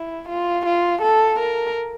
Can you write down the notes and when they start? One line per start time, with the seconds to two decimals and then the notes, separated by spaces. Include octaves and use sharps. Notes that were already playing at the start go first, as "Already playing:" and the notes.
Already playing: E4
0.29 F4
0.66 F4
1.02 A4
1.40 A#4